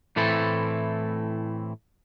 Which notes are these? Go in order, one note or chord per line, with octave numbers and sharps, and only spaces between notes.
A2 E3 A3 C4 E4 A4